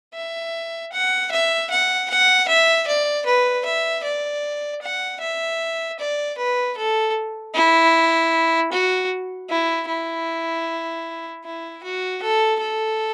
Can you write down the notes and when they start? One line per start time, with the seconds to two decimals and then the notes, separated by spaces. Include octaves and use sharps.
0.14 E5
0.92 F#5
1.31 E5
1.70 F#5
2.10 F#5
2.48 E5
2.87 D5
3.25 B4
3.65 E5
4.04 D5
4.82 F#5
5.21 E5
5.99 D5
6.38 B4
6.77 A4
7.55 E4
8.72 F#4
9.50 E4
9.88 E4
11.44 E4
11.83 F#4
12.22 A4
12.61 A4